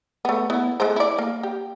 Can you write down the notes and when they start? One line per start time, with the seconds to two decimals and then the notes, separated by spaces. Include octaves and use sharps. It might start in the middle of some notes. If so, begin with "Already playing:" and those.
0.25 A3 B3
0.50 B3 E4
0.80 G#3 A3 C5
0.96 E4 D5
1.19 A#3
1.43 G4